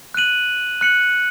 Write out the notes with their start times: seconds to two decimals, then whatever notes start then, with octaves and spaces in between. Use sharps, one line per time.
0.14 F#6 D#7 F#7
0.81 F#6 C#7 F#7